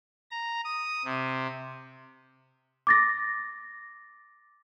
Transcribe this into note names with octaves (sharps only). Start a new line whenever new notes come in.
A#5
D#6
C3
D6 A6 A#6